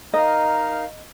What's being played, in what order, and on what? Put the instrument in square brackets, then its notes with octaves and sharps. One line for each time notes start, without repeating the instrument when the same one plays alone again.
[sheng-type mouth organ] D#4 A#4 F5 [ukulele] D#5